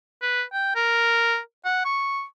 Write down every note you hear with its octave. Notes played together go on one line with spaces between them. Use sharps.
B4
G5
A#4
F#5
C#6